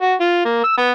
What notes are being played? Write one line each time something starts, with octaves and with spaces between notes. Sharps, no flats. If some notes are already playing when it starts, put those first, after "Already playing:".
F#4
F4
A#3
E6
B3